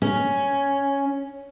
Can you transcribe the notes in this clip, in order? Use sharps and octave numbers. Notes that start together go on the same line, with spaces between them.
C#4